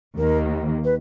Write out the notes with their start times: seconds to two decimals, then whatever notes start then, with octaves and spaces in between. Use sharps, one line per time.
0.18 D#2 D#3 A#3 A#4
0.84 B4